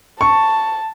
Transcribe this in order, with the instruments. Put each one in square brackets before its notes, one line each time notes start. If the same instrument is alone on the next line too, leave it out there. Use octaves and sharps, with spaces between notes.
[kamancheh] A5 [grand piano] C#6